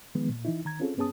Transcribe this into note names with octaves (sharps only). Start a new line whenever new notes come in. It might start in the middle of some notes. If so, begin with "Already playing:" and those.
D#3 F3 G#3 B3
A#2
E3 D#4 E4
D#3 A#5 G#6
C4 C#4 F4 G#4 A4
G2 B3 C#4 G#4 A5 D#6